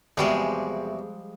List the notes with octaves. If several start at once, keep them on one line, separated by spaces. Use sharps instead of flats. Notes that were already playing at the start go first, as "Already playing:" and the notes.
E2 C3 F3 G3 G#3 F#4